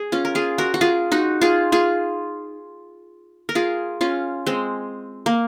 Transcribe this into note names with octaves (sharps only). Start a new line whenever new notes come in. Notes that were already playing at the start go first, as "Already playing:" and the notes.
Already playing: G#4
C#4 F4
A#4
F4 G#4
F#4 A#4
F#4
F4 G#4
D#4 F#4
F4 G#4
F4 G#4
A#4
F4 G#4
C#4 F4
G#3 C4
A#3